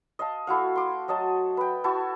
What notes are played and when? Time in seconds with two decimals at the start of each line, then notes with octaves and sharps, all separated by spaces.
0.19 D#5 F5 A5
0.47 A3 E4 F#4 F5
0.76 C6 D6 D#6
1.08 F#3 D#5 A5
1.57 B4 G5
1.84 E4 F#4 A5 C#6